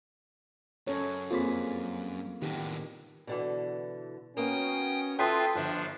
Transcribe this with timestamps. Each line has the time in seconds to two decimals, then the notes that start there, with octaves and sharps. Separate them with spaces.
0.87 F#2 C#4 A4 C#5
1.31 F2 A#3 F4 G#4 B5
2.42 A2 D#3 B3 G4
3.27 B2 D3 E3
4.37 A#3 B3 C#4 F#4 G5 D#6
5.19 F4 A4 B4 E5 G5 C6 D#6
5.55 G1 F3 D4